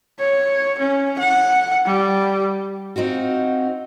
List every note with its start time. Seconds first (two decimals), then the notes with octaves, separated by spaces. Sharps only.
0.20 C#5
0.79 C#4
1.19 F#5
1.86 G3
2.96 C4 D#4 F4 F#4